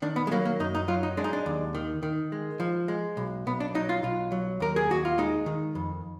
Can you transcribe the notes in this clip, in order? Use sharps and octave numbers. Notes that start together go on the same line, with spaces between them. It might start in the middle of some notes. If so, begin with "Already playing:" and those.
D#3 D4
B3
G#3
F#3 A#3
A#3
F#2 D#4
D#4
F#3 F4
D#4
G#3 D4
D#4
D4
D#2
D#3
D#3
G#3
F3
G#3
B1
B1 B3
D4
F#3 D#4
F4
B1 F4
F#3
D#2 A#4
G#4
D#2 F#4
F4
G#3 D#4
D#3
F2